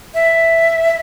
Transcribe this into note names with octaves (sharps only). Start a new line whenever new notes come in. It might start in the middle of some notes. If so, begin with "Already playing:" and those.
E5